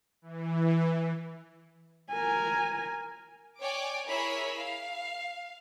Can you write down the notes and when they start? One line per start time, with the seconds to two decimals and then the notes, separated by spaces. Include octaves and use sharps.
0.22 E3
2.11 A#4 G#5
3.62 C#5 D5 G5 G#5 D6
4.08 E4 G#4 A#4 C#5 B5 E6
4.60 F5